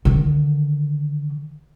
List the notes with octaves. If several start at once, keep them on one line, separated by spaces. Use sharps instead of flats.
D3 D#3